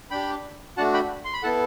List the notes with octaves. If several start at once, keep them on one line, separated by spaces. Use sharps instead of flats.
D4 G4 G5 B5
A3 D4 F#4 F#5 A5
G5 B5
C6
B5
B3 E4 A4 F#5 A5